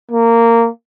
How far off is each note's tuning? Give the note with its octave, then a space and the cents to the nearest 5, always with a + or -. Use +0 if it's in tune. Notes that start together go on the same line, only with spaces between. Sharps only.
A#3 -15